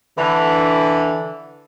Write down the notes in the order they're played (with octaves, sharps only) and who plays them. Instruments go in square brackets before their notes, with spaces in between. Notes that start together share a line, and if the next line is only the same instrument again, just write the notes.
[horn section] D3 E3